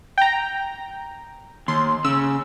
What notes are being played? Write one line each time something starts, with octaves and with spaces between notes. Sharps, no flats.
G5 A#5
D#2 C6
C#3 E6